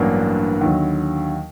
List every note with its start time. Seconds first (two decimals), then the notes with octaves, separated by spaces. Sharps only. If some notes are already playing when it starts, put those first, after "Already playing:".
Already playing: A1 G2 F#3 A#3 D4
0.61 D#2 D3 F#3